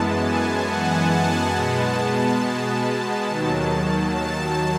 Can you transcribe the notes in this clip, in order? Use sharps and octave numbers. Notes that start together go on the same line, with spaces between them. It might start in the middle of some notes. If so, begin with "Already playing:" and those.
Already playing: F#2 E3 G#3 B3 A5
G#5
F#5
A5
B2 G#3 B3
D#2 D#3 F#3
A5